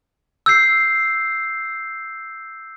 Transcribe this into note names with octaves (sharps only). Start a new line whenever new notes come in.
E6 G6 C7